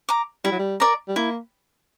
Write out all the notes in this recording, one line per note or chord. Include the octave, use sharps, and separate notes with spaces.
A#5 D6
G3 E4
F#3
G3
A#4 D5 A#5
G3
A#3 E4